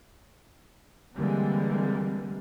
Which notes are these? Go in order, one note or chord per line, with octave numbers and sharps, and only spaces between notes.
D3 E3 G3 G#3 A#3 C4